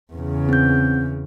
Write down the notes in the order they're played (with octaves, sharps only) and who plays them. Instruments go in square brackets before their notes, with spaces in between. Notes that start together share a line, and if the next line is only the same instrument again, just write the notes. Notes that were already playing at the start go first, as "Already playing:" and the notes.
[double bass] E2 C#3
[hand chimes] C4 G6